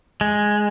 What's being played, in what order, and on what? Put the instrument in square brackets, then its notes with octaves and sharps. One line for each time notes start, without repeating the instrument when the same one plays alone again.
[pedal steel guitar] G#3